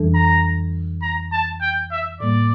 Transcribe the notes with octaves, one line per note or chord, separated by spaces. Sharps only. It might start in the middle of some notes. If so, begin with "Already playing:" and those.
Already playing: F2 E3 G3 D4 A4
A#5
A#5
A5
G5
E5
A2 G3 A#3 D5